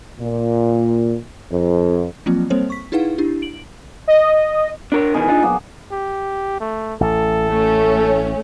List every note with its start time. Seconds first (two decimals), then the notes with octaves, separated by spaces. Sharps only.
0.20 A#2
1.52 F2
2.26 F3 F#3 A#3 C4 F4
2.50 G3 A#3 C4 A4 C5 C#5
2.70 C#6 B6
2.92 D#4 E4 G#4 B4 F5 F#5
3.18 D4 E4 G4
3.42 D7 F#7
4.08 D#5
4.92 D4 A#4 C#5
5.14 B2 D#3 E3 G#4
5.28 D4 D#4 F4
5.43 B1 A#3 B3
5.91 G4
6.60 A3
7.01 A1 A4
7.48 A3 C#4